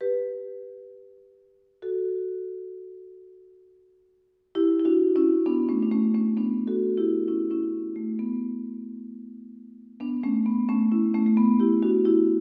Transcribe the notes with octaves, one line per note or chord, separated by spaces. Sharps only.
G4 B4
F#4 A4
E4 G4
E4
D4 F#4
C#4 E4
B3 D4
A3 C#4
D4
A3 C#4
A3 C#4
B3 D4
F#4 A4
E4 G4
C#4 E4
C#4 E4
A3
B3
B3 D4
A3 C#4
B3
A3 C#4
C#4 E4
A3 C#4
A3
B3
E4 G4
D4 F#4
E4 G4